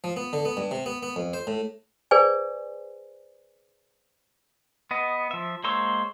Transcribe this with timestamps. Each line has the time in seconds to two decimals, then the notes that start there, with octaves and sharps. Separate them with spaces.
0.04 F3
0.16 B3
0.33 D3
0.45 B3
0.57 G2
0.71 C3
0.86 B3
1.03 B3
1.16 F2
1.33 C5
1.47 A2
2.11 G#4 B4 C5 D5 G#5
4.91 B3 D#5
5.31 F3 E5
5.64 G#3 A#3 C5 C#5 E6